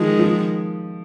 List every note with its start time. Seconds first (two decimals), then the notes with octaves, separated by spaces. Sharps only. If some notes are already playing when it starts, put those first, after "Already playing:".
Already playing: D#3 F3 G#3
0.19 F3